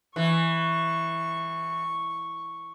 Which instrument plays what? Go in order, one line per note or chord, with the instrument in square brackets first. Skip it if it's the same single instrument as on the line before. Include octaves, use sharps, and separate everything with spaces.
[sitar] E3 [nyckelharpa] C#6